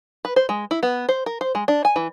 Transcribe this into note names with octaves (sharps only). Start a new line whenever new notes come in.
B4
C5
G#3
E4
B3
C5
A#4
C5
G#3
D4
G#5
E3